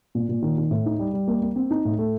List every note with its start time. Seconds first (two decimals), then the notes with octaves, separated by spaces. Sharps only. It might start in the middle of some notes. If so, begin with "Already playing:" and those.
0.15 A#2
0.29 A#2
0.42 D#3
0.58 D#3
0.71 A2
0.86 D#4
0.99 G3
1.13 G3
1.28 A#3
1.42 A#3
1.56 C4
1.71 D#4
1.85 A2
1.99 A3